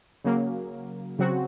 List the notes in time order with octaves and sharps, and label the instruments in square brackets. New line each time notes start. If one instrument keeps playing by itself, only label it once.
[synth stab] C#3 F#3 A#3
C#3 F#3 C4 F#4